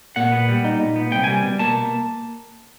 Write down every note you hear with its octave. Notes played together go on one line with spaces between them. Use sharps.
A#2 F#5
B3
G3
D#4
A#2
B3
C2 G5
G3 G#5
B2
A#3 A5